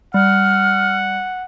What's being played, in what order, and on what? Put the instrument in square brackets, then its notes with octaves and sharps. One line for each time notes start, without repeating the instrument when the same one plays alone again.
[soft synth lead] G3 [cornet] F#5 [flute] F6